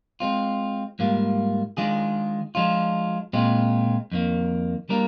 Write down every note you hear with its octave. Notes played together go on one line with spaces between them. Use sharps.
G#3 C4 F4
G#2 G3 A#3 F4
D#3 G#3 D4 F4 G#4
F3 G#3 D4 F4
A#2 G#3 C4 F4
F2 D#3 A#3
G3 A#3 D4 F4 A#4